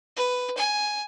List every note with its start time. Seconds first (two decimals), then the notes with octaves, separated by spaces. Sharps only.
0.16 B4
0.57 G#5